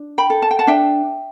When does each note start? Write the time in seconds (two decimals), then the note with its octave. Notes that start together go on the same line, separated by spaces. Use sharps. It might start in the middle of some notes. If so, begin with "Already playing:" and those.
Already playing: D4
0.18 G5 B5
0.30 A4
0.42 A5
0.51 G5
0.59 F#5 A5
0.67 D4 E5 G5